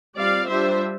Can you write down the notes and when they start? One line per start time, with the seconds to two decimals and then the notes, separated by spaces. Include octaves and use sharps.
0.17 G3 C4 F4 D5 F5
0.48 G3 D4 F4 C5 E5